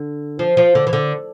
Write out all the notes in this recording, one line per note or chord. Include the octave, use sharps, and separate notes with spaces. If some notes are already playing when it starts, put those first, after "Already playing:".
Already playing: D3
F3
F3
D3
E3
D3